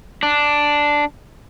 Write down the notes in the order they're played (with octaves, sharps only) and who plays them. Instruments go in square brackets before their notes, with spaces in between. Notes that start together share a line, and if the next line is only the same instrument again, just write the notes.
[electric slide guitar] D4